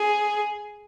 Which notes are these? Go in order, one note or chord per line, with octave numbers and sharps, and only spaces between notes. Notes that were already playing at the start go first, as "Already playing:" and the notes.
Already playing: G#4